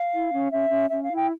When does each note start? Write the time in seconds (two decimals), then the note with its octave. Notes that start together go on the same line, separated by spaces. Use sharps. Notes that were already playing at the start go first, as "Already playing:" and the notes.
Already playing: F5
0.13 E4
0.32 C#4
0.51 C#4 E5
0.71 C#4
0.90 C#4 E5
1.03 F5
1.10 E4
1.16 G5